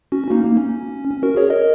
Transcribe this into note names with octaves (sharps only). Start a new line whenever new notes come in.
C#4 F#4
C#4
A#3 D#4
A#3
C#4
C#4
F#4 A#4
G#4 C#5
A#4 D#5